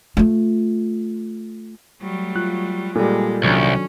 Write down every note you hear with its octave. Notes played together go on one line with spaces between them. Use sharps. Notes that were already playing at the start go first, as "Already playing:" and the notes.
A3 F4
F#3 G3 A3
F4 F#6
A#2 G3 G#3 D#4 A4
C2 D#3 F#3 C#4 D4